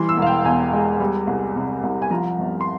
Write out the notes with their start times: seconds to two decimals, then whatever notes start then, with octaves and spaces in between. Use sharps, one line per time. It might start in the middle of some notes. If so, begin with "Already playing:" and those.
Already playing: E3 G3 C6
0.09 E6
0.17 E1 F5
0.27 G5
0.45 E2 G#5
0.73 G#3
1.00 G3
1.27 C2
1.56 C3
1.83 C2
2.02 G#5
2.11 F3 A#5
2.39 G1
2.61 C6